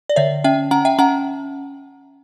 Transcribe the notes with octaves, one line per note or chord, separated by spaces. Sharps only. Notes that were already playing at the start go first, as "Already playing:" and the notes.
D5
D3 C#5 E5
C#4 E5 G5
C#4 F#5 A#5
E5 G5
C#4 F#5 A#5